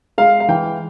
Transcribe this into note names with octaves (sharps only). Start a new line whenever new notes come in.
G#3 F5
F5
E3 G5